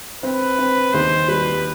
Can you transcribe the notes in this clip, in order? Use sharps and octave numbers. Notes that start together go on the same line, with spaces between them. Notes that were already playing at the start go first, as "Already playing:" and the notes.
C4 B4
C4
D#2 C5
G3 B4